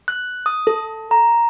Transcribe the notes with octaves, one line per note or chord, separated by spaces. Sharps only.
F#6
D#6
A4
A#5